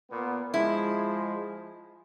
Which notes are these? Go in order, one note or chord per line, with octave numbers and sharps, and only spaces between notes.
A#2 B3
F3 G#3 E4